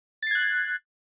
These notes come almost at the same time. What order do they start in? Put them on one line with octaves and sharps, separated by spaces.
A6 C7 G#6 F#6